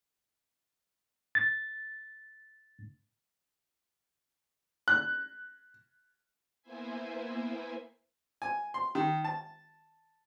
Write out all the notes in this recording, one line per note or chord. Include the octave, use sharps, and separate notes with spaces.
A6
F#6
A#3 B3 E4 C5 E5 G#5
G#5
C6
D#3
A5